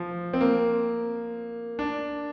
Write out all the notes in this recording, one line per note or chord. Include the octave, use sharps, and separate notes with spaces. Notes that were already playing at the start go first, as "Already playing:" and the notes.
Already playing: F3
C4
A#3
D4